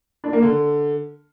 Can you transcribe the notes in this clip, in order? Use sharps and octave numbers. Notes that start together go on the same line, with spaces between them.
D4
A#3
D3